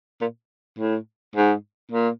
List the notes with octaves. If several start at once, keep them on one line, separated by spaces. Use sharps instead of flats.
A#2
A2
G#2
A#2